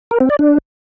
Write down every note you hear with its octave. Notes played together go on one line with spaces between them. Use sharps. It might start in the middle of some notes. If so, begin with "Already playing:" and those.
A#4
C4
D5
D4